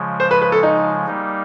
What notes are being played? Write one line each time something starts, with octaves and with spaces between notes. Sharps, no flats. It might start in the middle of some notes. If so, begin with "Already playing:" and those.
Already playing: C#3 F3 G#3
C5
B4
B4
A4
D#4
G3 A#3 D#4